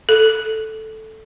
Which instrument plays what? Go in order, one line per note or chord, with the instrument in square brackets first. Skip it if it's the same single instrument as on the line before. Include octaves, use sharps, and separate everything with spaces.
[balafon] A4